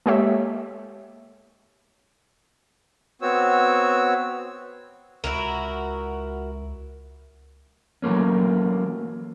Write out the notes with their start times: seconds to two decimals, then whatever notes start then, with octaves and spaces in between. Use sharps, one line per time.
0.06 G#3 A#3 G4 A4 C#5 E5
3.22 B3 C4 F#4 C#5 E6
5.24 C#2 E4 F#4 A#4
8.02 E3 F#3 A3 A#3 C#4